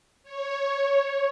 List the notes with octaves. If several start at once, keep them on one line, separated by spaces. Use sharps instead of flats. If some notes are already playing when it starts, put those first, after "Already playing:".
C#5